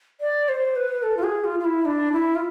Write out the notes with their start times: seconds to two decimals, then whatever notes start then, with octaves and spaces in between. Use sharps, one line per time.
0.21 D5
0.49 C5
0.76 B4
1.03 A4
1.17 F4
1.23 G#4
1.44 F4
1.60 F4
1.65 E4
1.85 D4
2.12 E4
2.35 F4